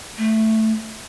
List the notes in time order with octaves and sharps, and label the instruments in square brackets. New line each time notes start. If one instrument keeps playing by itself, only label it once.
[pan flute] A3